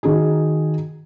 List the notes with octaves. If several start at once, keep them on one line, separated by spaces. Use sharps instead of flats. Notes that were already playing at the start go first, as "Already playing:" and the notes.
D#3 D#4 F#4 G#4